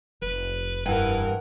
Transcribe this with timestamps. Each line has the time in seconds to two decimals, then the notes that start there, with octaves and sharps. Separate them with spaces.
0.22 F1 B4
0.86 G2 E3 A#4 B4 F#5